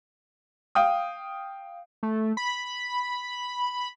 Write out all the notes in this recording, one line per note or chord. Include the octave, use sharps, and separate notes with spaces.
F5 G5 D#6
A3
B5